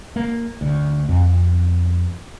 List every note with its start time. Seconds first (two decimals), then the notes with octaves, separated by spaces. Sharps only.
0.16 A#3
0.61 D2
1.09 F2